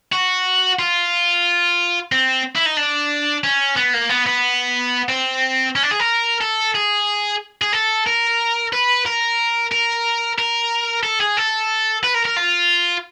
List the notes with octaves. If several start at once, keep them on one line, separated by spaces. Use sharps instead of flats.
F#4
F4
C4
E4
D#4
D4
C#4
B3
A#3
B3
B3
C4
C#4
D4
G#4
A#4
A4
G#4
G#4
A4
A#4
B4
A#4
A#4
A#4
A4
G#4
A4
B4
A#4
A#4
F4